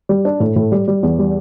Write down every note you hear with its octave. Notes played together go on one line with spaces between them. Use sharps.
G3
D4
A2
A2
G3
G3
E2
G3